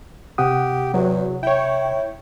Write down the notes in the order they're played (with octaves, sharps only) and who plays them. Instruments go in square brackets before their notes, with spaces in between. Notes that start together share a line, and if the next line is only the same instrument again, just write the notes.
[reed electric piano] C3 F#5 D#6 [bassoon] G4
[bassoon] E2 [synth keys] F#3
[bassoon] E4 [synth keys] C#5 G5